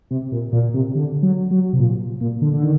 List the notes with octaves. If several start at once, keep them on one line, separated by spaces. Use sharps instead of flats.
C3
A#2
A#2
C3
D3
F#3
F#3
C3
A#2
A#2
D3
D3
D#3